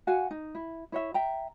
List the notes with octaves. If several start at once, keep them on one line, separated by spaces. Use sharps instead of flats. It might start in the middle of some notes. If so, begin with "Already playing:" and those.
F#4 F5 F#5 G#5
D#4
E4
E4 C#5 E5
E5 G5 A#5